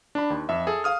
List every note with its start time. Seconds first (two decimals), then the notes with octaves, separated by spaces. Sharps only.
0.15 D4 B5
0.30 D#2
0.49 F2 E5
0.67 G#4 A4
0.84 F5 D#6 F6